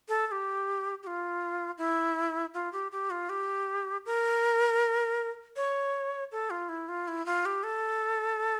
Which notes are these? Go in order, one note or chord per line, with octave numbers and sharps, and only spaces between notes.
A4
A4
G4
G4
F4
E4
F4
G4
G4
F4
G4
A#4
C#5
A4
F4
E4
F4
E4
F4
G4
A4